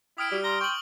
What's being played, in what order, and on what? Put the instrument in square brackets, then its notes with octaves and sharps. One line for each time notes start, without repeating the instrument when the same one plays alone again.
[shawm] E4 [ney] G5 [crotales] D#6 F6 D7
[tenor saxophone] G3 [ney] F#4
[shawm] A#5 [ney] C6 [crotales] G7
[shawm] G5 [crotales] C#6 F#7